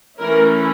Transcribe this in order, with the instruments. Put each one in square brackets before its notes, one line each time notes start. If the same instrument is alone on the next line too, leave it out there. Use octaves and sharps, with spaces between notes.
[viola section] E3 A3 C#4 E4 A#4